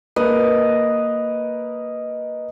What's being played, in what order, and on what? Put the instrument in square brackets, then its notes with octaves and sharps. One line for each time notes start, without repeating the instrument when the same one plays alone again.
[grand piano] A#3 A#4 B4 [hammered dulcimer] D#5